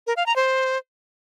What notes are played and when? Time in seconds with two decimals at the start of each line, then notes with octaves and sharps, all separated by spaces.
0.07 A#4
0.17 F5
0.26 A#5
0.36 C5